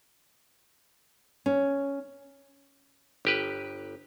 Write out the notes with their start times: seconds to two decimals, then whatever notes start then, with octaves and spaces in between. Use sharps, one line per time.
1.46 C#4
3.25 G1 G4 B4